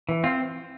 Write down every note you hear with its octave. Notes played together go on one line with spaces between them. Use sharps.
E3
C4 F4